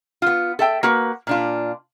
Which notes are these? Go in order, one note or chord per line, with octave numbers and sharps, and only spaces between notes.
B3 F4
A4 E5 G5
A#3 F#4 B4
A#2 D4 F4